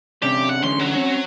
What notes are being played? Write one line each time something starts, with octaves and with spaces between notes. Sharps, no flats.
C3 C#4 D4 G4
F#5
D3 E3 C#4 C6
F#3
C4 C#4